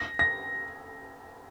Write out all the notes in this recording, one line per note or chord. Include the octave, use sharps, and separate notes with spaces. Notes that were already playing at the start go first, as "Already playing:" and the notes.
Already playing: A#6
A#6